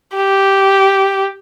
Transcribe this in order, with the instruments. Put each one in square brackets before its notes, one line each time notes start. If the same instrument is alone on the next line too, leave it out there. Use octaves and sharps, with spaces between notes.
[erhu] G4